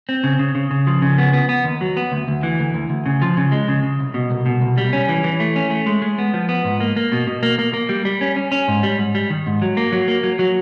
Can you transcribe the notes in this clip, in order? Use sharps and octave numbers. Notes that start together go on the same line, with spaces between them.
C4
C#3
C#3
C#3
C#3
F3
C#3
B3
B3
B3
D#2
F#3
B3
D2
D2
E3
D2
D2
D2
C#3
F3
C#3
G#3
C#3
C#3
C2
B2
C2
B2
C2
G3
C#4
E3
E3
A3
C#4
A3
G#3
G#3
B3
F3
B3
G#2
A#3
A#3
B2
B2
A#3
A#3
A#3
G3
G3
C#4
C#4
C#4
G#2
G3
G#2
G3
D#3
G#2
F#3
A#3
F#3
A#3
F#3
F#3